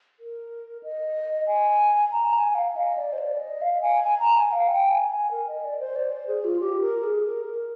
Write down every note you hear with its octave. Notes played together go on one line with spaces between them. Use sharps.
A#4
D#5
G#5
A#5
G#5
F5
D#5
D5
C5
D5
D#5
F5
G#5
G#5
A#5
G#5
F5
G5
G#5
G#5
A#4
D#5
D5
C5
D5
C5
G#4
F4
G4
A#4
G#4
A#4
A#4